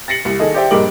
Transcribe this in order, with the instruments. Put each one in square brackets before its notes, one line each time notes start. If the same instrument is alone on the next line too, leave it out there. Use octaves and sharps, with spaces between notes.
[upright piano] A6 A#6 C7 C#7 F#7
C2 C#7
D#3 G#4 A4 D#5
G4 C5 D5 E5 G5
A#1 G2 G#3 A#4 D6 F#7